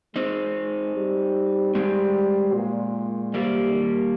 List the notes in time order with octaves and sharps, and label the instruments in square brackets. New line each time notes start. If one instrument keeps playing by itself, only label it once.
[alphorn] G#3 [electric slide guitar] C4 D#4
[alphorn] G3
[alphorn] G3 [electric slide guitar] G#3 C4
[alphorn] A#2
[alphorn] C3 [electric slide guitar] G3 A#3
[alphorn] D#3